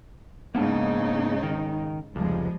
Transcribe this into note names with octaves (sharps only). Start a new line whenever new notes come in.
G#2 C#3 A#3 B3 D4 D#4
D#3
F1 C#2 F3 G3 G#3